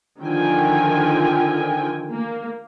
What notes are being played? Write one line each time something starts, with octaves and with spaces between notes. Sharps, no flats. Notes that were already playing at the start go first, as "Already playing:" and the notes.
D3 D#3 F3 G5 G#5
A#3